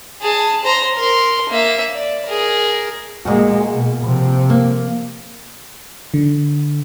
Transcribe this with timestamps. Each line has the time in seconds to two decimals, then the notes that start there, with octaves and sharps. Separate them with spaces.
0.21 G#4 A5
0.64 C5 A#5
0.96 A#4 C6
1.49 A#3 E5
1.94 D5
2.26 G#4 A#4
3.25 A#2 G#3 A#3 F#4
3.73 B2
4.04 C3 F3
4.50 A#3
6.14 D3